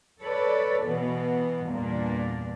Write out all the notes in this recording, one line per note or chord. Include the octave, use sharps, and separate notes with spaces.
A4 B4 C#5 D5
B2 E3 B3
E2 G2 A#2 A#3 D4